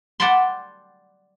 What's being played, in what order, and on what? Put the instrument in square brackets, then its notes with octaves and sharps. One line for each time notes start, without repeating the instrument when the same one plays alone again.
[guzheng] D5 F#5 G5 A5 B5 C6